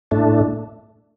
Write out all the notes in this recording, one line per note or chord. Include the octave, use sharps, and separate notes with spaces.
A2 A3 D4